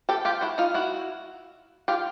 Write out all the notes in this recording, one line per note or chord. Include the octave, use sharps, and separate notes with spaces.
G4 A4
F4 G4
E4 F#4
D#4 F4
E4 F#4
F4 G4